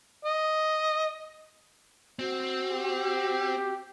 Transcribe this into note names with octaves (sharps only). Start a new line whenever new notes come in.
D#5
C4 F#4
G4